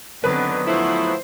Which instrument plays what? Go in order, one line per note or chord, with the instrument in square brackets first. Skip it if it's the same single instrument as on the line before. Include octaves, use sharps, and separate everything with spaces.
[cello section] D3 D#3 C4 [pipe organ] F#3 B3 [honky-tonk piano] B4
[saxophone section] F3 A3 E4 [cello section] C5